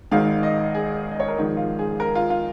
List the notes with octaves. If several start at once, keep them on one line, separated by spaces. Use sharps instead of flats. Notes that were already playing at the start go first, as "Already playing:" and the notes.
G#1 G#2 D#3 G#3 F5
D#5
G#4
D#5
C#5
A#4
A#1 G#2 D#3 G#3 G#4
F4
G#4
A#4
F4
F4